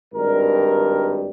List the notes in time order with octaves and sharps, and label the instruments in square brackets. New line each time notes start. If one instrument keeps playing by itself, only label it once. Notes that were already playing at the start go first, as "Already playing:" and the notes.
[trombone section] G#1 G2 D#3 G3 A#4